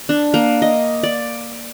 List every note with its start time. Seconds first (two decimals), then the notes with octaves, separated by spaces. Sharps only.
0.09 D4
0.34 A#3
0.62 D#5
1.03 D5